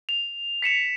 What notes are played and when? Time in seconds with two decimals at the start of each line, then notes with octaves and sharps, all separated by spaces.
0.09 F7
0.62 B6 C#7 E7 F7